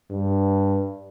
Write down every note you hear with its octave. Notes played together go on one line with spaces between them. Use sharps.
G2